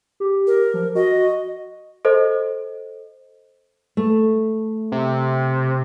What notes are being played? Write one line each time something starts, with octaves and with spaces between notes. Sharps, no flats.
G4
A#4
F3
F#4 D#5
A4 C5 D#5
A3
C3